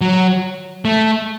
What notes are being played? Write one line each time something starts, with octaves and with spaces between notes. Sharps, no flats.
F#3
A3